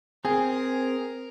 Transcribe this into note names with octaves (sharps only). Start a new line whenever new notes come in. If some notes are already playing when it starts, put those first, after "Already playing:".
C4 G#4 A#4